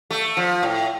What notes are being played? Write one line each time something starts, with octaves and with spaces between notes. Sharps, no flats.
A3
F3
A2